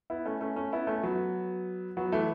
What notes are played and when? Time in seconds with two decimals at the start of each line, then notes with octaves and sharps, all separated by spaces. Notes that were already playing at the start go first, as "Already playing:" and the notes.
0.10 B3 E4
0.26 A3 C#4
0.41 A3 C#4
0.56 A3 C#4
0.72 B3 E4
0.87 A3 C#4
1.03 F#3 B3
1.97 F#3 B3
2.12 E3 A3